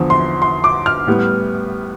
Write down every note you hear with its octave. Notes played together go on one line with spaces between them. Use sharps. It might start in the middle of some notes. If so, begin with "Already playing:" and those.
Already playing: E2 D3 F3
C6
C6
D6
F6
A2 G3 B3